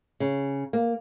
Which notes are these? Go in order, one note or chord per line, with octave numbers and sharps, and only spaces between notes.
C#3
A#3